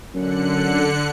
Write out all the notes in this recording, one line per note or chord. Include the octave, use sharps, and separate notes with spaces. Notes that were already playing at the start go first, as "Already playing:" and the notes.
F#2 D3 F#6 C#7